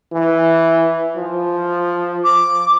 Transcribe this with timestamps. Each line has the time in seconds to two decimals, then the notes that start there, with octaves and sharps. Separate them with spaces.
0.13 E3
1.17 F3
2.24 D6